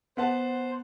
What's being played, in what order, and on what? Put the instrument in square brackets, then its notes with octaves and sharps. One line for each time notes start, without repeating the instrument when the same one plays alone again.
[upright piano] B3 F#5 A5 [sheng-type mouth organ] C5